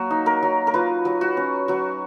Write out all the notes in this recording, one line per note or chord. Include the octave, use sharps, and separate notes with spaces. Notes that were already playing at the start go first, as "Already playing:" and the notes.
Already playing: F#3 A#3 F#4
D#4
A#4
F#3
A#4
F4 B4
F#3
F#4
C#4
F#3 F#4